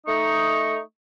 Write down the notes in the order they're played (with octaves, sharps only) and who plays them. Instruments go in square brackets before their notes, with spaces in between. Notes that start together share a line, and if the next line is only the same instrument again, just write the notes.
[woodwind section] A3 D#4 C#6